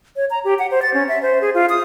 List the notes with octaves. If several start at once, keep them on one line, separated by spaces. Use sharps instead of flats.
C#5
A#5
G4
F#5
C5
A6
C#4
E5
C5
G#4
F4
D#6